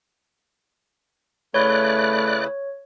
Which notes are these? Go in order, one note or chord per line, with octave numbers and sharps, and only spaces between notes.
C#3 A3 E4 B4 C#5 D5 F#6